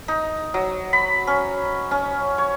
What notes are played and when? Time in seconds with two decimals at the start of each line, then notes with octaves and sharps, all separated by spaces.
0.08 D#4
0.54 F#3
0.93 B5
1.27 C#4
1.91 C#4
2.38 C#5